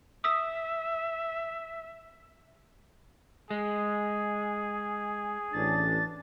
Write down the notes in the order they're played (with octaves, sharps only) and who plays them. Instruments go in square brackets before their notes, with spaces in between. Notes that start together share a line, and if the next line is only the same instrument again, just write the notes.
[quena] E5 [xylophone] D#6 E6 B6
[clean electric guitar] G#3 [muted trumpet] G#4
[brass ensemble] A1 D4 [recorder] A6